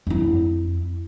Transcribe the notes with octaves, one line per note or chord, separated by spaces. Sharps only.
F2 E4